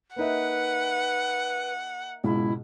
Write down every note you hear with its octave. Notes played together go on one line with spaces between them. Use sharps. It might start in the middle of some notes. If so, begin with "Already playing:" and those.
A#3 D#4 B4 E5 F#5
C#2 G#2 B2 E4